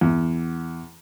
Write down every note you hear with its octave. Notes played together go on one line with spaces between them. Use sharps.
E2